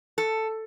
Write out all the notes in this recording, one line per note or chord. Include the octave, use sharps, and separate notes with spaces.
A4